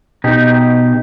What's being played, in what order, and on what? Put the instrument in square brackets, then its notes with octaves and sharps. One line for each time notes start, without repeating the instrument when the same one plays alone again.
[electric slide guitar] B2 D#4 G4